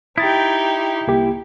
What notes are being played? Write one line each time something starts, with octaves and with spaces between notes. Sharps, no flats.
D#4 E4 G4 D#6 A6
C2 A#3 G4